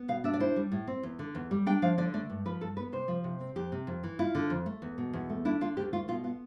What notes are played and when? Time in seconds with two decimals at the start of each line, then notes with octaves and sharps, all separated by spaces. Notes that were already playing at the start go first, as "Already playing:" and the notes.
Already playing: B3
0.08 B2 F5
0.24 D4 E5
0.34 D5
0.40 E4 C5
0.56 G3
0.72 A2
0.87 C4
1.03 E2
1.19 D3
1.35 E2
1.51 G3
1.66 D4 G5
1.82 F3 F5
1.98 D3 D5
2.14 A3 D5
2.30 G2
2.46 F3 B4
2.61 G2 A4
2.77 B3 B4
2.92 C3 C5
3.08 F3
3.24 C3
3.41 C4
3.56 F2 G4
3.72 C3
3.87 F2
4.03 E3
4.19 E4 F4
4.35 D3
4.50 F2
4.66 A3
4.82 E2
4.98 B2
5.13 E2
5.29 A3
5.45 D4 E4
5.61 D3 F4
5.77 D2 G4
5.93 A3 F4
6.08 B2 F4
6.24 B3 F4